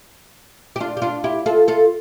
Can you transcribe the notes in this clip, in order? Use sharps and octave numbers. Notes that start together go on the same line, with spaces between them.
G4
D4 F4
G4
D4 F4
E4 G4
F4 A4
F4 A4